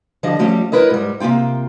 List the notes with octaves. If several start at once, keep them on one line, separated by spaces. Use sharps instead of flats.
D3 F3 G3 D4 D#5
F3 G3 A3 C#4
E4 A#4 B4 C#5 D#5
G#2 G3
C3 F3 A#3 F4 G5